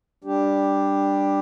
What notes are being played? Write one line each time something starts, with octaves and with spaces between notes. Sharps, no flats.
G3 D4 G4